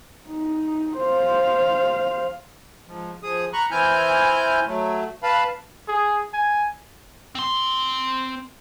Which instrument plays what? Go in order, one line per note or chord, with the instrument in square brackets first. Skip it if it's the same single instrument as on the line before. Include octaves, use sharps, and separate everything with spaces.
[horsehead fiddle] D#4
C5 F5
[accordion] G#2 F3
F3 G#4 D#6
A#5 B5 C#6 F#6
E3 C4 E4 G#5 F6 G6
F#3 A3
B4 F5 A5 B5
[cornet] G#4
G#5
[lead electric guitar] C4 C6